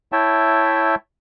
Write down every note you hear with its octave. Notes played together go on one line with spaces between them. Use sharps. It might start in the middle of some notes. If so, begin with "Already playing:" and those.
E4 C#5 E5 G5 A5